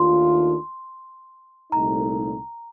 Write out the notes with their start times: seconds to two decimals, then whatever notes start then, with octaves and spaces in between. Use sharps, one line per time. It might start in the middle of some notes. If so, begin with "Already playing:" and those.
Already playing: D#2 D#3 A3 D4 F4 C6
1.72 C2 A#2 A3 D#4 A#5